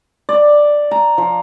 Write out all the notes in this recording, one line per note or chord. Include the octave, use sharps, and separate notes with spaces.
D5
A#5
F3